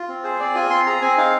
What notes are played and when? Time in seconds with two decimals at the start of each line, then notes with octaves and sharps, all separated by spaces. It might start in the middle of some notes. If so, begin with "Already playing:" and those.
Already playing: F4
0.08 C4
0.24 G#4 C5
0.40 C4 D5
0.55 F4 G#5
0.70 C4 C6
0.86 G#4 A#5
1.02 C4 G#5
1.17 D#4 F5